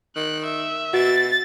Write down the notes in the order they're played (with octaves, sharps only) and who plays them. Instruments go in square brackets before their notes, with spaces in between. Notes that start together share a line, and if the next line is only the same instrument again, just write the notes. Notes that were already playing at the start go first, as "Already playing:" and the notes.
[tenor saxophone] D#3 [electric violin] F#6
[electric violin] E5
[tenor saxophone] B2 [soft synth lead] F#4 [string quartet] A6